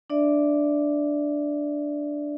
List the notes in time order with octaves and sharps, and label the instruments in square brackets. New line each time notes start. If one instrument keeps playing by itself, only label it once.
[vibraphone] D4 D5 E5